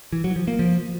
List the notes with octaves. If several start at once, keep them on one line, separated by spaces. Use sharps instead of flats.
E3
F#3
F3
A#3
F3